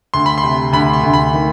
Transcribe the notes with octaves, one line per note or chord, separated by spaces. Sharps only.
D2 C6
B5
C6
C3
D2 B5
C6
D2
B5
D#3